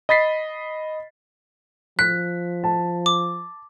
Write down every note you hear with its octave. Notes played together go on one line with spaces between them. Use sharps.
D#5 B5 A6 B6 C7
F3 F#6 B6
A5
D6